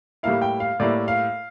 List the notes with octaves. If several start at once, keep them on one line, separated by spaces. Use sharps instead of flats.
A2 G3 A#3 E4 F5
G5
F5
A2 G3 A#3 E4 D5
F5